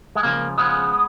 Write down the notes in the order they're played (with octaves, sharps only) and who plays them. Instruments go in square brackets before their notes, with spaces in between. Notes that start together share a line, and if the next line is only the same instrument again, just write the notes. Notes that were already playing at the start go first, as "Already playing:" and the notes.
[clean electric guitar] G#3
C#2 C#3 F3 A#3
C#2 C#3 F3 G#3 B3